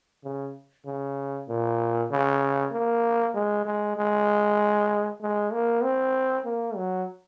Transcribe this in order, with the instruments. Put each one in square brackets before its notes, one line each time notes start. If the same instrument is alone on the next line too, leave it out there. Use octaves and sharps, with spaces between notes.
[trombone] C#3
C#3
A#2
C#3
A#3
G#3
G#3
G#3
G#3
A#3
C4
A#3
F#3